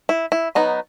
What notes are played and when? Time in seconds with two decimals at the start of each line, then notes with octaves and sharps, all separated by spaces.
0.09 E4
0.32 E4
0.55 F#3 B3 D#4